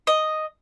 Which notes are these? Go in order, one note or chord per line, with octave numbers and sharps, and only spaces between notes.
D#5